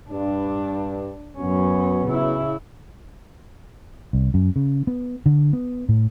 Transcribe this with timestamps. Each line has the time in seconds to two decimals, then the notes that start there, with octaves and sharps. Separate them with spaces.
0.10 G2 D4
1.38 F#2 F#3 B3 C#4
2.07 C#3 E4
4.13 C2
4.34 F#2
4.56 C#3
4.87 B3
5.26 D3
5.53 B3
5.89 A2